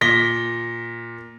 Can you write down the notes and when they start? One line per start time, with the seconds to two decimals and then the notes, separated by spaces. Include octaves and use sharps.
0.01 A#2 A#6 B6 G7